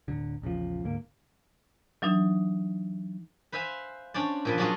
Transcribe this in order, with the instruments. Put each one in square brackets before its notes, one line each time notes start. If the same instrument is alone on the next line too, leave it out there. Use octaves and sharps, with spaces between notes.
[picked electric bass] D1 D3
A#1 E2 C#3 F3
D2 G#2 D3 A#3
[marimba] E3 F#3 D4 D#4
[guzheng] B4 C5 E5 F5 G#5
C#4 D4 C5 D5
A#2 F3 B4
F#3 B3 D4 F4 F#4 G#4